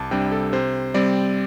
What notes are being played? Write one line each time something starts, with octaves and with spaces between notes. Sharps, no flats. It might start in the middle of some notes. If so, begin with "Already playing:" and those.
Already playing: C2 A5 D6
C3 G3 D4 G5
A4
C3 C5
G3 C4 D5